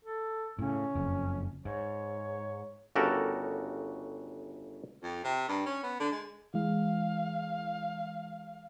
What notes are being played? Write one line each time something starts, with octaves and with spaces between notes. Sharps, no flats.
A4
A2 C#3 C#4
F#1 F2
G#2 C#5
G1 C#3 F#4 G4 A4 A#4
F2
C3
G2
C#4
B3
D3
G#3
E3 G#3 F5